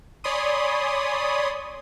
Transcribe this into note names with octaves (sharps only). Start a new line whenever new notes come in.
C#5 D5 G#5 B5 C6 D#6